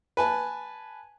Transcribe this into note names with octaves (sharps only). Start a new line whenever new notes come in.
B4 G#5 A5